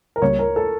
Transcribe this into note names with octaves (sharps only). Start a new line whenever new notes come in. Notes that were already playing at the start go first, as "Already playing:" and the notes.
A#4
C#2 C#3 G3 A#3 C#5
A#4
A4